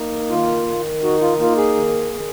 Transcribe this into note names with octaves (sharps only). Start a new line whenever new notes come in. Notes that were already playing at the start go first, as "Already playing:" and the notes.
Already playing: A#3 D#4
D#3 F4
D#3
D#4 F#4
F4
A#3 F4
G#4
D#3
D#3